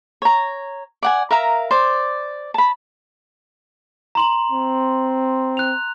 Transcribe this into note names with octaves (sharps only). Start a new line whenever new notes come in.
C#5 A#5
D5 F#5 G#5
A#4 E5 F5 A#5
C5 D5
A5 B5
A#5 C6 F#7
C4
F#6 F7